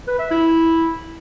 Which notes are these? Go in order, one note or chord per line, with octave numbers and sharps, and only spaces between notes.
B4
E5
E4